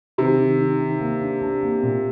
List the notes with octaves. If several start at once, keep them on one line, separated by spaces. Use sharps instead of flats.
C3 D#3
D#3
D#3
D#3
A#3
D4
D4
A#3
A#2